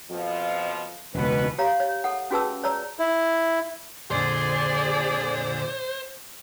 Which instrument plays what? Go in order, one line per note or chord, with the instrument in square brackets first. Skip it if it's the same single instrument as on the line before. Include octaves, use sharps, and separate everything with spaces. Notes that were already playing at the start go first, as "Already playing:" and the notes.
[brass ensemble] F2 B2 F3
[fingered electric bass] E1 C#2 [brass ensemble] B2 B4
[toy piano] G4 C#5 F5 A#5
C#5
A4 F#5
C#4 F#4 G#4 B4 A5 E6
C#5 D5 A#5 E6
[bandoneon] E4
[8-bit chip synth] F2 A#2 D3 [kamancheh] G#4 D5 [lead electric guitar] C5